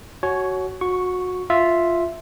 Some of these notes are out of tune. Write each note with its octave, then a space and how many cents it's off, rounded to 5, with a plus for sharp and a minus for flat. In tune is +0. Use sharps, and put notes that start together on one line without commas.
F#4 +15 C#5 +0 G#5 +45
F#4 -25 C#6 +0
F4 +0 E5 +0